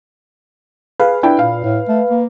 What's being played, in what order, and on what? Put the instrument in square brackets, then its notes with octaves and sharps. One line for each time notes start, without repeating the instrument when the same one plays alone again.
[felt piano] G#4 F5 [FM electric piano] B4
[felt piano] D4 E4 G5
[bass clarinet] A#2 [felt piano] F5
[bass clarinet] A2
A3
A#3